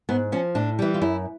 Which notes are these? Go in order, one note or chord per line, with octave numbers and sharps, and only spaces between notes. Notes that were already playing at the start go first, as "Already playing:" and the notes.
G#2 B3
F3 C#4
A2 D4
E3 G3
F4
F#2 E4